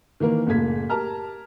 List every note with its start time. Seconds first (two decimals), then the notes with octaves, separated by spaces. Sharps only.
0.20 D#3 E3 A#3 A#4
0.47 F#1 A2 A#3 G#6 B6
0.90 G4 A#4 A5 A#5 F6